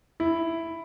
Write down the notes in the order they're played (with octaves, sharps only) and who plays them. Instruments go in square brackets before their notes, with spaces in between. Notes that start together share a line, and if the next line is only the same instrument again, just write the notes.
[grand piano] E4